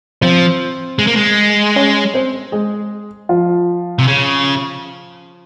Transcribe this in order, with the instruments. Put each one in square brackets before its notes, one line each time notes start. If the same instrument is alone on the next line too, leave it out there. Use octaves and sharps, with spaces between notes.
[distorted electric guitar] F3 [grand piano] C4 C5
[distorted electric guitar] G#3
A#3
G#3
[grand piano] C#4 C#5
C4 C5
G#3 G#4
F3 F4
[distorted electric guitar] C3
C#3